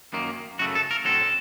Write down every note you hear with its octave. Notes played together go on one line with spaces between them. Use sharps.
F#2 D#3 A#3
F#2 C#3 A3 F#4
A4
A#4
A2 F#3 C4 A4